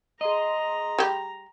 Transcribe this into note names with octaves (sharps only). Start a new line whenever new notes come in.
G#4 D#5 A#5 C6
G3 G4